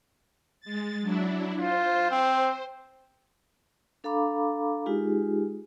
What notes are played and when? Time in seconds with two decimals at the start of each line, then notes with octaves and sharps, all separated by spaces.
0.61 G#3 A6
1.02 F#3 D4 E4
1.60 F4 C5
2.11 C4
4.04 D4 A4 F5 A#5 B5 D6
4.86 G#3 D#4 F4 G4 G#4